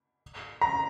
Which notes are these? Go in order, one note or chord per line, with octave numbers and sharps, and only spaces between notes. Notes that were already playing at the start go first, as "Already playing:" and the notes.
A#5